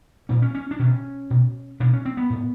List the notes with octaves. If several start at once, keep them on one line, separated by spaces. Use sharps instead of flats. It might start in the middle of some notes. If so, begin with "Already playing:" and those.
A#2 C#4
C#4
C#4
D4
B2 C#4
B2
B2 D4
C#4
C4
B3
A2